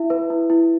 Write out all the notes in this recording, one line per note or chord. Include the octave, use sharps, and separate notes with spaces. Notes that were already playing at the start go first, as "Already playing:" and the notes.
Already playing: E4 E5
B4
E4
E4